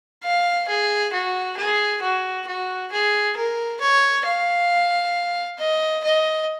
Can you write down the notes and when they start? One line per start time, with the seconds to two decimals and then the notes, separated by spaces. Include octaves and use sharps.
0.23 F5
0.68 G#4
1.13 F#4
1.57 G#4
2.02 F#4
2.47 F#4
2.92 G#4
3.36 A#4
3.80 C#5
4.25 F5
5.59 D#5
6.04 D#5